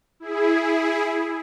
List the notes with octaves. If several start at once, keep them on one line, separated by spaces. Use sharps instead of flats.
E4 G#4